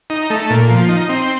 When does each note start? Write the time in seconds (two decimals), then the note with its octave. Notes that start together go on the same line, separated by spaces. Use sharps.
0.10 D#4
0.30 A3
0.50 A#2
0.70 F3
0.89 D#4
1.09 C4